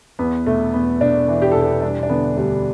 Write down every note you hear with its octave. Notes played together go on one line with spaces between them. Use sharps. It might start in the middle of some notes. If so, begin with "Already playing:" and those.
E2 B3
E1 A3
E2 B3
E1 D4
E3
G4
E1 A4
G4
G3 D4
D4
D3 B3
D2 G3